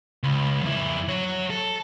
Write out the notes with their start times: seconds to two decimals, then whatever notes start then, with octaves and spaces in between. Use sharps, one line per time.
0.23 C#2
0.62 F2 E4
1.08 F#3 C#5
1.50 A4